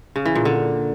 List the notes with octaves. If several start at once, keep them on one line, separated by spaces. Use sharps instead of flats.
C#3
E3
A#2
D3